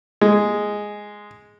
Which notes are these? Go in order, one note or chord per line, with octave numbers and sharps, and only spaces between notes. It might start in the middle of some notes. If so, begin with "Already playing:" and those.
G#3